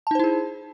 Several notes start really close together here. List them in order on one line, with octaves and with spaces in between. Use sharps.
A5 D#4 C5 E4 G#4